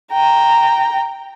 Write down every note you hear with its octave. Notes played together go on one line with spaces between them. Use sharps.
G5 A#5